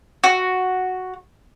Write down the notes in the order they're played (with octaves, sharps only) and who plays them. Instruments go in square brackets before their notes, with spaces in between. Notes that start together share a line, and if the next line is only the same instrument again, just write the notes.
[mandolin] F#4